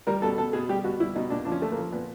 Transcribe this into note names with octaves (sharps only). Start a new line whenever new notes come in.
G3 A#4
B2 A4
B2 A4
B2 G#4
G3 G4
B2 F#4
G3 E4
B2 D#4
A#2 D4
F3 D4
C#4
A#2 A3
A#3
F3
A#2 B3